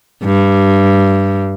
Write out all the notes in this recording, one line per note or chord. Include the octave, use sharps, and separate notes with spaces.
G2